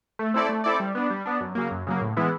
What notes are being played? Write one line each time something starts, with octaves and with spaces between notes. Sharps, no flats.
A3
C4 E4 A4 D5
A3
C4 E4 A4 D5
G3
B3 D4
G3
B3 D4
F#2
C#3 F#3 A#3
F#2
C#3 F#3 A#3
A2
E3 G#3 B3 E4